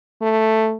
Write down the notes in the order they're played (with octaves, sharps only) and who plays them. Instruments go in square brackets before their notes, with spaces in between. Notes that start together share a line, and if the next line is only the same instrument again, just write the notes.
[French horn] A3